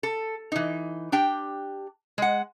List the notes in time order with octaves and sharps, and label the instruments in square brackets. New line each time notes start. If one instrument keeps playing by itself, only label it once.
[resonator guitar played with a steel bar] A4
E3 D#4
D4 G4 G5
G#3 F#5